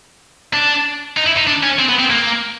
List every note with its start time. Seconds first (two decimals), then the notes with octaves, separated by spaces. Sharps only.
0.53 D4
1.17 D#4
1.27 E4
1.37 D#4
1.47 D4
1.63 C#4
1.79 C4
1.89 B3
1.99 C4
2.10 A#3